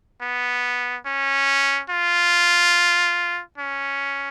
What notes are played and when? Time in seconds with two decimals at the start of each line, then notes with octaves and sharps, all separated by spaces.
0.22 B3
1.06 C#4
1.90 F4
3.58 C#4